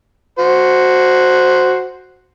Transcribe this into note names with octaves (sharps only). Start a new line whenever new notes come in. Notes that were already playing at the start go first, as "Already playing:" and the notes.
F#4 C5